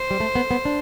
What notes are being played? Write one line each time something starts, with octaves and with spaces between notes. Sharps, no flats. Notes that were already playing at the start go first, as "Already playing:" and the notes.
Already playing: C5
G3
A3
B3
B3
D4